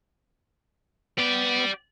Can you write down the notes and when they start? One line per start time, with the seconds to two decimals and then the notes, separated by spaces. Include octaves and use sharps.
1.18 B3 G4 D5